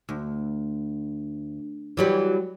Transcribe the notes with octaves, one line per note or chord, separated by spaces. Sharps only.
D2
E3 F#3 G3